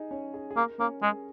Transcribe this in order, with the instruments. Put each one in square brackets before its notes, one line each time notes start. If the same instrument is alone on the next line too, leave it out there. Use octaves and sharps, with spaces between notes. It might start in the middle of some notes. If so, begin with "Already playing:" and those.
Already playing: [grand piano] D#4 G#4 D#5 G#5
C#4 C#5
G#4
G#4
[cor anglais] A#3 [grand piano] A#4
[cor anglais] A#3 [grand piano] C#4 C#5
[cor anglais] G#3 [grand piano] G#4